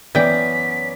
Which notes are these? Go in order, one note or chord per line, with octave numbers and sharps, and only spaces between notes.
F#2 E3 B3 C#4 D5 G5 B6